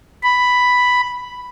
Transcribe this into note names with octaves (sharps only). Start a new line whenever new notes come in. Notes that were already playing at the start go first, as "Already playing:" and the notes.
B5